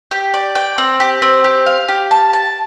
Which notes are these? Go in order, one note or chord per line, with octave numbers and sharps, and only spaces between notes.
G4
D5
G5
C4
G4
C4
G4
F5
G4
A5
A5